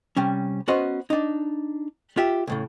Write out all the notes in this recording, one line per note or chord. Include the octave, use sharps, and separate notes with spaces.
C3 G3 C#4
B3 C#4 F#4 C5 D#5
D4 D#4
F4 G4 E5
C2 A2 C#3